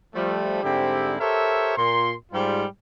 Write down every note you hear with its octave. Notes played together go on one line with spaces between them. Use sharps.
F3 G3 A3
G#2 D3 G3 C4 E4 G4
G4 A4 A#4 C5 C#5 E5
A#2 C6
G#2 G3 F4